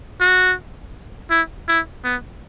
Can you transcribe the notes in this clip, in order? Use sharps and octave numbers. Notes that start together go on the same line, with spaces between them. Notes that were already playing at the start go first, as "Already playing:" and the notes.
F#4
E4
E4
B3